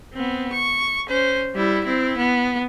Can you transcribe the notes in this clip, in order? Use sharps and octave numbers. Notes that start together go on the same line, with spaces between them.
B3 C4
C#6
C#4 C5
G3 E4
C4 E4
B3